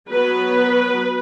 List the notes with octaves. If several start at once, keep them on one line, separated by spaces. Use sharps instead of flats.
F#3 B3 B4